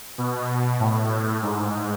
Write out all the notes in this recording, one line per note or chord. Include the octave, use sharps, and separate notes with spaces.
B2
A2
G#2